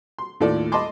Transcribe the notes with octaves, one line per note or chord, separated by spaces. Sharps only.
C6
D#2 A2 F4 A4 D5
D#5 A5 B5 C6 D6